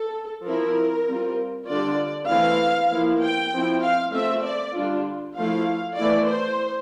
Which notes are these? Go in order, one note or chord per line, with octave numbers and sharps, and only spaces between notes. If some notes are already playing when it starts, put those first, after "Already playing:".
Already playing: A4
F3 C4 E4 A#4
G3 C4 F4
D3 G3 D4 F4 D5
E3 A3 C4 E4 F5
F3 A#3 E4
G5
F3 C4 E4
F5
A3 C4 F4 E5
D5
D3 G3 D4 F4
F3 A3 E4 F5
E3 A3 E4 D5
C5